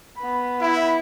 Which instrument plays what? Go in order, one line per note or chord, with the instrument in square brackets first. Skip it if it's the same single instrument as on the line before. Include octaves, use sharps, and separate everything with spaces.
[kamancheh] B3 B5
[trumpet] E4